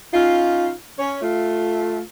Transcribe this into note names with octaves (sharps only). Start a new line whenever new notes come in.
C#4 D#4 F4
C#4 C#5
A3 F4